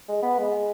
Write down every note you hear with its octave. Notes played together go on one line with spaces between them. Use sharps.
G#3
B3
G#3